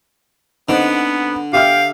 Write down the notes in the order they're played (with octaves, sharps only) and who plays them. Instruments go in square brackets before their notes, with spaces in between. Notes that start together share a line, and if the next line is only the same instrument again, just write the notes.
[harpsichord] D3 [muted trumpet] B3 [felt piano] C4 D#4
[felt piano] G4 E5 F6 [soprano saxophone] F5 [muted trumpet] G5